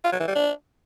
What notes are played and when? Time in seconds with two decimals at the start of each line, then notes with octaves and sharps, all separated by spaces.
0.05 F4
0.12 F#3
0.20 E3
0.28 G3
0.35 D4